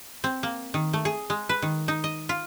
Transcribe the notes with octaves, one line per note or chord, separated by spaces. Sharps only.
C4
A#3
D#3
A3
G#4
G#3
B4
D#3
D#4
D#5
F4